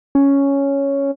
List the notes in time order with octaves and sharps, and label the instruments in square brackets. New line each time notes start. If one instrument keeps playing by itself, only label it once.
[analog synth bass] C#4